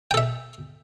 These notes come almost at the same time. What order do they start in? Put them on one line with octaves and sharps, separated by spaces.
G5 A4 E5